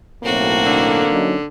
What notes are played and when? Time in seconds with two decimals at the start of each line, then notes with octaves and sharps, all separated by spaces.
0.24 B1 A2 A#3 C4 F#4
0.66 D3
1.11 F#3 C#4 D#4